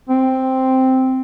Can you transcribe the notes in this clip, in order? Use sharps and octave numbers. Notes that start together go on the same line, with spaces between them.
C4